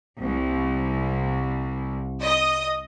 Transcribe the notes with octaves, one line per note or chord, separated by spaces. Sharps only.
C2
D#5